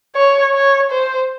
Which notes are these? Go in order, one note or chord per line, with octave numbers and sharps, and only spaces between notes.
C#5
C#5
C5